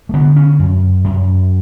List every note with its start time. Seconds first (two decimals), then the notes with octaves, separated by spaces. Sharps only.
0.09 A3
0.13 D3 B3
0.36 C#4
0.59 F#2
1.04 F#2